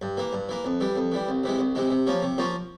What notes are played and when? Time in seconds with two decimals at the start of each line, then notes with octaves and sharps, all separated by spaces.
0.02 G2
0.17 E3 A#3
0.33 G2
0.49 E3 A#3
0.64 F2
0.80 E3 G3
0.96 F2
1.12 E3 G3
1.28 C2
1.43 C3 E3 G#3
1.59 C2
1.75 C3 E3 G#3
1.90 C3
2.07 F3 A#3 C#4 F4
2.22 C3
2.38 F3 A#3 C#4 F4